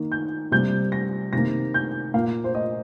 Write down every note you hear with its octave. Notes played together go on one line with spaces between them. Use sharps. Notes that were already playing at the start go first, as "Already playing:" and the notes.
Already playing: D#3 A#3
G6
C3 G3 A#3 G6
A#6
C3 D#3 A#3 A#6
G6
A#2 A#3 F5
C5
D#5